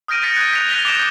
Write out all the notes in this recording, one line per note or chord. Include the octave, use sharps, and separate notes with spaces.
D#6 F6 G6 A#6 D7 D#7
G6 A6 B6 C#7 D#7
F#6 G#6 D#7
G6 B6 D7 D#7 F7
F#6 G6 A#6 B6 F7 G7
D6 G6 G#6 B6 D7 E7